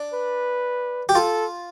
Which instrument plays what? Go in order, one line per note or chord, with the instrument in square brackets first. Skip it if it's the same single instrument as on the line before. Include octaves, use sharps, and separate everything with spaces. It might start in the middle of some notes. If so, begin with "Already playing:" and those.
Already playing: [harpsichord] D4
[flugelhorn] B4
[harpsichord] G4
[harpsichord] F4 [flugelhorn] A4